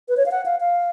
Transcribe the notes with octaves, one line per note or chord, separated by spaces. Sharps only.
B4
C#5
F5
F#5
F5
F5